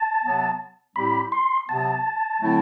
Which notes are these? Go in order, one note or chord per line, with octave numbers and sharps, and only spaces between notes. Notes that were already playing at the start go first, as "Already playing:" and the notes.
Already playing: A5
C3 F#3 B3
A2 G3 C4 E4 G4 B5
C6
C3 F#3 B3 A5
D3 F#3 A3 C4 E4